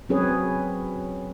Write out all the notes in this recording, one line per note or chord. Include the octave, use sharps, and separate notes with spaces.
F#3 C4 C#4 G#4 B4 C#5